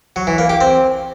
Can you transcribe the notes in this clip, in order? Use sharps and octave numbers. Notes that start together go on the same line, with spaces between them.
F#3
E3
A#3
G4
C4